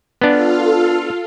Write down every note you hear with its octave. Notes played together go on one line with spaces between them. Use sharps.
B3 D4 F4 A4 F5